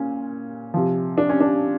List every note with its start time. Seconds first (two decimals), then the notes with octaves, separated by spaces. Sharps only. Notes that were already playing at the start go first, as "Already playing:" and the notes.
Already playing: A#2 C#4
0.74 C3 F3
1.18 D4
1.29 C#4
1.40 D4